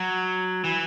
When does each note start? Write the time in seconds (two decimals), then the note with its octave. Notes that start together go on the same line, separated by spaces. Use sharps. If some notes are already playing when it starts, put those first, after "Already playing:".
Already playing: F#3
0.64 E3